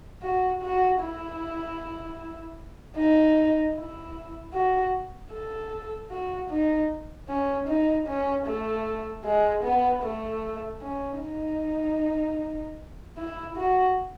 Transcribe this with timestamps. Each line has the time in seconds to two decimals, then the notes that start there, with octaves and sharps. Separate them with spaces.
0.22 F#4
0.62 F#4
1.01 E4
2.97 D#4
3.75 E4
4.54 F#4
5.32 A4
6.11 F#4
6.50 D#4
7.29 C#4
7.68 D#4
8.07 C#4
8.46 A3
9.25 G#3
9.64 B3
10.03 A3
10.82 C#4
11.21 D#4
13.17 E4
13.57 F#4